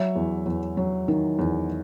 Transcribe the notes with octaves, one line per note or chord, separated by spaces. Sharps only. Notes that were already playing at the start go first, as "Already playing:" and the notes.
Already playing: F#3 C#5 E5
E2
E2
F#3
D#3
E2